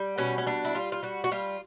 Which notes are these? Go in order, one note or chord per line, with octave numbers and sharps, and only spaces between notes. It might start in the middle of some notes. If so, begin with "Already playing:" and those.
Already playing: G3
B2 C#4
C#4
G3 D4
E4
G3 F4
F4
G3 F#4
F#4
G3 F4